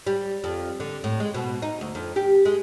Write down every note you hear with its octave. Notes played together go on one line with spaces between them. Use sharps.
G3
F2
D3
A2
G#3
B2
D#4
D2
F2
G4
G#3